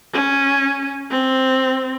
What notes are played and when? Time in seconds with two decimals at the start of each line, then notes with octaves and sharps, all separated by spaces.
0.13 C#4
1.11 C4